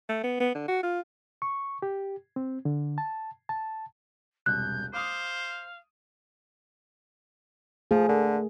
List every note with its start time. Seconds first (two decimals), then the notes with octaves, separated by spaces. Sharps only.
0.09 A3
0.24 B3
0.40 B3
0.55 D3
0.68 F#4
0.83 F4
1.42 C#6
1.82 G4
2.36 C4
2.65 D3
2.98 A5
3.49 A5
4.46 E1 C2 F#6 G6
4.93 C5 F5 D6 D#6
7.91 F3 A3 G#4
8.09 D3 A#4